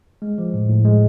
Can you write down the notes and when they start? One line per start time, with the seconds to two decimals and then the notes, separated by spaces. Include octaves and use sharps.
0.22 G#3
0.38 F3
0.54 A2
0.69 A2
0.85 G#3